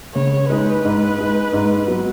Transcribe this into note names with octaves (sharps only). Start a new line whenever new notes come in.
C#3 C#5
G#3 D#4 B4
G#2
G#3 D#4
G#2
F#3 B3